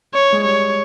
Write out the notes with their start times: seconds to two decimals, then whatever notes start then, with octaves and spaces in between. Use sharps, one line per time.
0.14 C#5
0.33 G#3
0.43 G3 C#5